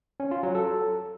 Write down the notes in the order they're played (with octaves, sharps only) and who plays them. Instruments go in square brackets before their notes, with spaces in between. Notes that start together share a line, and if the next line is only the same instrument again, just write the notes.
[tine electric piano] C#4
F4
F#3
A4